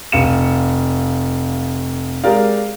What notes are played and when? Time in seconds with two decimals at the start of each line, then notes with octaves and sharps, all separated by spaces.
0.12 F1 F5 C#7 E7
2.24 G#3 G4 A#4 D5 F5